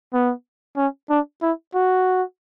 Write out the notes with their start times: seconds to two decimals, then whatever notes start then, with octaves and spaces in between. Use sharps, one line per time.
0.13 B3
0.77 C#4
1.10 D4
1.42 E4
1.74 F#4